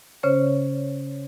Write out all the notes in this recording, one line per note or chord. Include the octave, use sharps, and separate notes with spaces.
C#3 C#4 C5 C#5